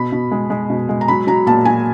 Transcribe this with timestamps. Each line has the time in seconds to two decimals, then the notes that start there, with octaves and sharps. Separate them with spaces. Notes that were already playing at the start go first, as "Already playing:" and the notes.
Already playing: B2 B5
0.12 B2
0.32 G#3
0.50 G#3
0.70 B2
0.89 G#3
1.01 A#5
1.08 F#3 B5
1.27 F#3 A#5
1.47 A#2 A5
1.65 F#3 G#5